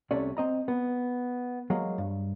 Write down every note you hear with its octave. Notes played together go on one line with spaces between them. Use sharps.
C2 C3 A3 C#4 D5
C4 D#5 A#5
B3
F#3 G#3 A#3
G2